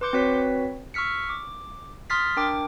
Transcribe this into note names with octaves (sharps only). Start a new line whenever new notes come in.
B4 C6 D6 G6 C#7
C4 F#4 B4 C#5 B6
C#6 E6 F6 B6 C#7
D6
C6 D#6 F6 A6 B6 C7
D4 A#4 G5 D6